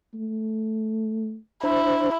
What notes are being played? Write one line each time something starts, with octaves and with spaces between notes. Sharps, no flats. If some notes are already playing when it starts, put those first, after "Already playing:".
A3
D4 E4 C5